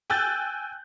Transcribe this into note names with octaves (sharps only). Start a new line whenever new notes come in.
G5 G#5 E6 F#6 G6 A6